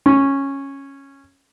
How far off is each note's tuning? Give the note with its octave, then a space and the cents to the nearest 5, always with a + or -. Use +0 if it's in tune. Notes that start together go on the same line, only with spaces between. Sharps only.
C#4 -10